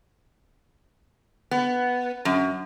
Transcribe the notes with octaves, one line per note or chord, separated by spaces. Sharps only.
B3
F#2